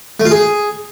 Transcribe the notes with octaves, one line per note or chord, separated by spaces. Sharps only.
A3
F4
G#4